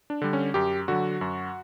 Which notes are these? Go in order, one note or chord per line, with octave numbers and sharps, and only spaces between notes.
D4
D3 G3
C#4
F#2 G4
D3 F#3 F#4
F#2